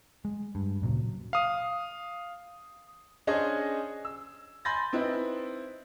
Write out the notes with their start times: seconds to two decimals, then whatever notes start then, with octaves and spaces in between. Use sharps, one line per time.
0.25 G#3
0.55 G2
0.82 D1 A#2 C#3 F#3
1.33 F5 D#6
3.27 C#4 D4 G#4 C5 C#5 D#5
4.05 E6
4.65 G#5 B5 C6 G6 A6 A#6
4.93 C4 D#4 E4 B4